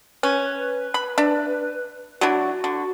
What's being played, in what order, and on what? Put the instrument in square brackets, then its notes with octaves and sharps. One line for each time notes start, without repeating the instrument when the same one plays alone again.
[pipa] C#4 [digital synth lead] B4
[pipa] B5
D4 E5
[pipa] F#3 D4 E4 [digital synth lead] F#4
[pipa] D3